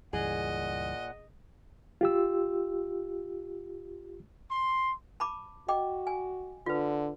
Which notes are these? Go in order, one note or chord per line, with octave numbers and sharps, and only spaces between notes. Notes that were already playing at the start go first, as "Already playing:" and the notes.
C#2 G2 A#2 E3 G#4 D#5 F#5
F4 G4 E6
C6
A5 B5 D6
F#4 D#5 G5 D6
G#5
D3 F4 B4